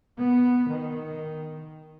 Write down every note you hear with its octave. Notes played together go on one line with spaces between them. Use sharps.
B3
D#3